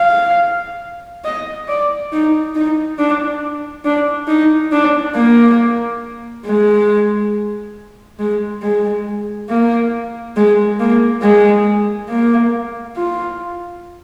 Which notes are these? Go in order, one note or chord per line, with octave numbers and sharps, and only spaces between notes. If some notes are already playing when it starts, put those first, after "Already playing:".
Already playing: F5
D#5
D5
D#4
D#4
D4
D4
D#4
D4
A#3
G#3
G#3
G#3
A#3
G#3
A#3
G#3
A#3
F4